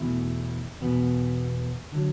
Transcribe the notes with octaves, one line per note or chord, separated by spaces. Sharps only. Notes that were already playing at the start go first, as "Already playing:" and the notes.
Already playing: E2 B2 A3 E4
E2 B2 B3
D3 F#3